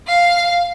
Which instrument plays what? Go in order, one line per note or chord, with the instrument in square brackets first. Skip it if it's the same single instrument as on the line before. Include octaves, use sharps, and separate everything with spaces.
[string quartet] F5